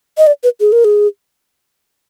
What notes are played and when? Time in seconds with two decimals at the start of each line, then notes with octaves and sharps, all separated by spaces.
0.18 D#5
0.27 D5
0.43 B4
0.60 G#4
0.72 A#4
0.85 G#4